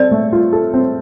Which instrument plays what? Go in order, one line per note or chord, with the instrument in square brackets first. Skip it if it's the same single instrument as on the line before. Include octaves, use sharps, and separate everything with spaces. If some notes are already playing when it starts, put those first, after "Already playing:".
Already playing: [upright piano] C4 A4 [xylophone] D5
[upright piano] A3
F4
A4
C4